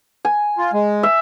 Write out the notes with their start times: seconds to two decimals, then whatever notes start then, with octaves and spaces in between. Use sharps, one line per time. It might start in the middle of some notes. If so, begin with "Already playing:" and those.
0.25 G#5
0.58 F4
0.73 G#3
1.03 E5